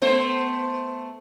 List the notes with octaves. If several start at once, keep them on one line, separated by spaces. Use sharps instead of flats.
A3 B3 C5